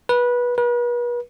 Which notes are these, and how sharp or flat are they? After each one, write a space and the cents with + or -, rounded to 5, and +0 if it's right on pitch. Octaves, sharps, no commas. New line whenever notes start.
B4 -20
B4 -40